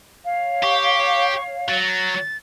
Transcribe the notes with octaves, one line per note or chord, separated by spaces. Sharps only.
C#5 F5
G4 C#6
F#3 A6